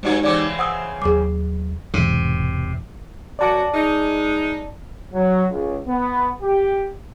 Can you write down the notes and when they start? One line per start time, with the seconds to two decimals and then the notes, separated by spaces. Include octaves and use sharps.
0.03 G2 F#3 G#3 D#4 G4 C#5
0.23 C#3 E3 C4 D5 D6
0.59 C5 F#5 D#6 E6
1.02 D#2 F#3 G#4 D6
1.94 E1 G#2 C3 E3
3.39 F#2 F#4 D5 A5 D6
3.73 G#3 D#4
5.13 F#3
5.50 C#2
5.87 B3
6.42 G4